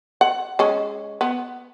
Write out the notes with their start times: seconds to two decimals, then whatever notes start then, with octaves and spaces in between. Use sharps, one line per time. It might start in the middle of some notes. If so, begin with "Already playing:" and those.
0.21 F#5
0.59 G#3 C#4
1.21 B3